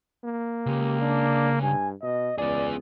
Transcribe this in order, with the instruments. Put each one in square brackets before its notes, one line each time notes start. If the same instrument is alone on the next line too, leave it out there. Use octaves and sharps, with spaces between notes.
[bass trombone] A#3
[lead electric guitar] C#2 C#3 [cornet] G4
[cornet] D4
[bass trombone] G2 [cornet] G#5
[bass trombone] B2 [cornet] D#5
[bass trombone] C#2 [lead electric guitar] B3 G#4 [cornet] D5